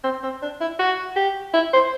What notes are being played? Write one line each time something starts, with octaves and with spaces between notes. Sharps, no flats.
C4
C4
D4
E4
F#4
G4
E4
C5